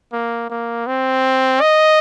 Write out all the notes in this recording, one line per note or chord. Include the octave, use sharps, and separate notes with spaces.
A#3
A#3
C4
D#5